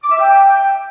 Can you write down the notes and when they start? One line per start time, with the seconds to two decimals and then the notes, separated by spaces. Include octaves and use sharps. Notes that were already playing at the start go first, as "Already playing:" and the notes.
0.03 D6
0.11 E5
0.19 G5